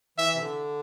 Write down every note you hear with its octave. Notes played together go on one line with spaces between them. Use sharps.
E3 E5
C3
D3